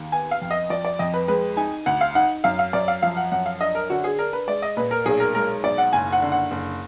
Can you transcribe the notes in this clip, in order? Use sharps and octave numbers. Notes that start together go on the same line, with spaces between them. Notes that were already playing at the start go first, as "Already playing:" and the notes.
Already playing: D#2
B3 G#5
F5
F2
D#5
F3 D5
D5
F2 D#5
B4
G#3 B4
D#4 G#5
D2 F#5
F5
D#4 F#5
F#2 F5
F5
F#2 D5
F5
F3 F5
F#5
F#2 F#5
F5
D4 D#5
A#4
D3 F#4
G#4
D4 A#4
B4
G#3 D5
D#5
A#2 B4
A#4
B1 G#4
A#4
G#3 A#4
B1 D5
F#5
F#1 G#5
F#5
D3
F#5
F#1